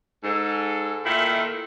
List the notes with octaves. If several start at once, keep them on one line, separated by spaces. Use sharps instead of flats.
G#2 A4
A#2 D#3 A3 E4 F4 A4